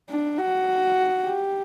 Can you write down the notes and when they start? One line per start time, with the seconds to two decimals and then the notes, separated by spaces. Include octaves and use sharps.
0.09 D4
0.38 F#4
1.23 G4